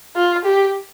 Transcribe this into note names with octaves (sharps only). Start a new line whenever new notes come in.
F4
G4